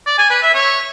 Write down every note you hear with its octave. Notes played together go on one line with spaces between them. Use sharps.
D5
G#5
B4
E5
C#5